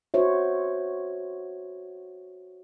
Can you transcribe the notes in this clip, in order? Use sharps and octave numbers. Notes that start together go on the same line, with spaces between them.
F#4 C5 C#5 E5